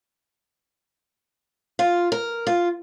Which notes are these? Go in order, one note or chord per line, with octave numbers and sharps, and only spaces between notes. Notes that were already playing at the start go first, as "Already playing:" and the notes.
F4
A#4
F4